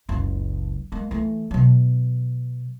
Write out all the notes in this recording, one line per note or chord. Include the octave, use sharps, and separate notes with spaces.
F#1 C#2
G#3 A#3
E3 A3
B2 F#3